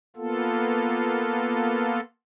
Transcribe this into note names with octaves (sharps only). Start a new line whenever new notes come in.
A#3 B3 F4 A4